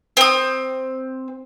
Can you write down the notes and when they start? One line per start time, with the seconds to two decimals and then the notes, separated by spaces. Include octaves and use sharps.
0.17 C4 D#6